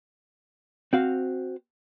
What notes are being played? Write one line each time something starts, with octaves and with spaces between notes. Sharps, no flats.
C4 F#4 F5